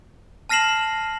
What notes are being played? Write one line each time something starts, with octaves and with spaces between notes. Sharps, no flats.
A5 F6 A#6 C7 E7 F#7